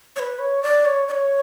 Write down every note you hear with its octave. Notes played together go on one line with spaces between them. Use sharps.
C#5
B4
C#5
D5
C#5
D5
C#5